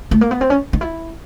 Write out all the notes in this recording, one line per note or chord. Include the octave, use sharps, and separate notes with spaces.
A3
A#3
B3
C4
C#4
D#4
E4